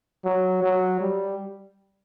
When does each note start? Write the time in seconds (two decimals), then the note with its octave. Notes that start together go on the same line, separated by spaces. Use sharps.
0.25 F#3
0.63 F#3
1.01 G3